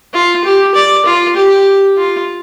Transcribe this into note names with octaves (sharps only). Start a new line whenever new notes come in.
F4
G4
D5
F4
G4
F4